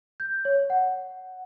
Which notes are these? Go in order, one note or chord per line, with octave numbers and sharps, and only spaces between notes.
G6
C#5
F#5